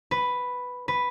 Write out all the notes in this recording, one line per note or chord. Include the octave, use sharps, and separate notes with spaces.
B4
B4